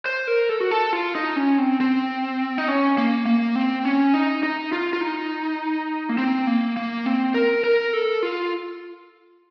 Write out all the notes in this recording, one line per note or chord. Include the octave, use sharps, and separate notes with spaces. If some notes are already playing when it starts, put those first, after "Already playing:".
C5
A#4
A4
F#4
A4
F4
D#4
C#4
C4
C4
D#4
C#4
A#3
A#3
C4
C#4
D#4
D#4
F4
F4
D#4
A#3
C4
A#3
A#3
C4
A#4
A#4
A4
F4